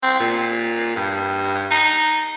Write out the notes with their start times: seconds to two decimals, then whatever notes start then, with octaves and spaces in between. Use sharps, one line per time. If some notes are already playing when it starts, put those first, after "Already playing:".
0.03 C4
0.20 A#2
0.96 G2
1.71 D#4